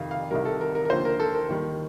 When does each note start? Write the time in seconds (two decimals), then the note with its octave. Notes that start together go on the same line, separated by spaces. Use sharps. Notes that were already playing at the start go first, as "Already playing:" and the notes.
Already playing: F2 C3 D#3 F5
0.11 F5
0.31 C2 C3 D#3 G3 A#4
0.45 A4
0.61 A#4
0.75 A#4
0.85 A#4
0.90 D#2 D3 F3 C5
1.05 A#4
1.20 A4
1.35 A#4
1.49 D#2 D#3 G3